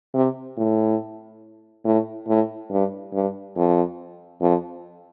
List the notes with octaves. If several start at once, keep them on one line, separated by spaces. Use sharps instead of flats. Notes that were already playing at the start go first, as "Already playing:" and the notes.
C3
A2
A2
A2
G2
G2
F2
F2